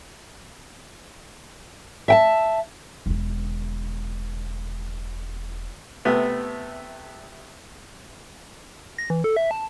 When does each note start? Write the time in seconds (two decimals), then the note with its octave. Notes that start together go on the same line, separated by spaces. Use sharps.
2.08 E5 G5 A5
3.06 E1 D3
6.05 C3 A3 B3
8.98 A#6
9.10 E3
9.24 A4
9.37 E5
9.51 A5